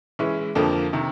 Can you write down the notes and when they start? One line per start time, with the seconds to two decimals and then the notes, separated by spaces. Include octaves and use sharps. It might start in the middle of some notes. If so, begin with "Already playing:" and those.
0.19 E3 G#3 C#4 E4
0.55 F2 D3 F3 A#3
0.93 C3 D#3